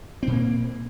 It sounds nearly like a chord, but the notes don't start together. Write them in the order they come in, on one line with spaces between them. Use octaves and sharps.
C4 A#2 A#3